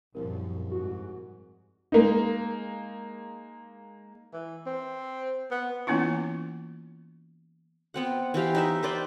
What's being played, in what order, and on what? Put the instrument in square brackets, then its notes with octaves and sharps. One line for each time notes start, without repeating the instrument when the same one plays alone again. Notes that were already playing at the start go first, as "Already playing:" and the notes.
[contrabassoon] C2 [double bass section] F#2 A#2 F3 [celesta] A#4 C5
[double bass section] G#2 [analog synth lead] F#4
[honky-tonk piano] G#3 A#3 D#4
[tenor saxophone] E3
C4
B3
[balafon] E3 A#3 B3 C#4 E4 F4
[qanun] B3 C4 F#5
E3 E4 G4 F5
D#4 B4 E5
B4 C5 D5 G5